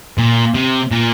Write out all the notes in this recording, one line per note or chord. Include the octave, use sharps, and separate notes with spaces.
A#2
C3
A#2